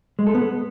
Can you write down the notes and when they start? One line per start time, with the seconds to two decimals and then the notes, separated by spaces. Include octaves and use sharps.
0.19 G#3
0.27 A4
0.34 B3